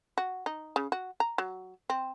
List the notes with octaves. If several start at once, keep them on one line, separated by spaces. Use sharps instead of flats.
F#4
D#4
C#3
F#4
A#5
F#3
C4